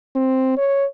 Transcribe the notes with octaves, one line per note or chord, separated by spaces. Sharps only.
C4
C#5